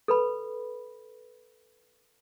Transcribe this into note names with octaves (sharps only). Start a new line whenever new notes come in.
A4 B4 B5